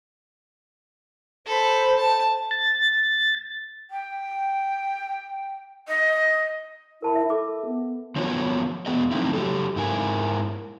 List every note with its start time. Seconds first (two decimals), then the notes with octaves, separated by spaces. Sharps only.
1.46 A4 C5 B5
1.96 A5
2.51 A6
3.91 G5
5.88 D#5
7.02 E4 A#4 A5 B5
7.15 E5
7.30 A4 D6
7.66 B3
8.16 D#3 F3 F#3 B3 F4 C#5
8.86 E2 B2 B3 G#4 D#5
9.11 F3 F#3 A3 C4 D#4 E4
9.33 F#3 F#4 G4 A4
9.76 G#2 E4 A#4 G#5